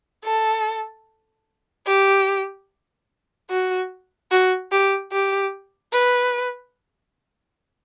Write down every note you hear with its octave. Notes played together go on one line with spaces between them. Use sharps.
A4
G4
F#4
F#4
G4
G4
B4